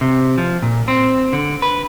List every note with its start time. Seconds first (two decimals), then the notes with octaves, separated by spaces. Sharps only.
0.01 C3
0.38 F3
0.62 A#2
0.88 C4
1.33 D3
1.62 B4